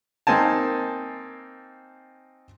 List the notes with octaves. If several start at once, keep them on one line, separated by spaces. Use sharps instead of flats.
A#3 C4 D#4 G#5 A5